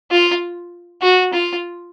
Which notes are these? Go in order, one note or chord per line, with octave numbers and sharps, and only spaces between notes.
F4
F#4
F4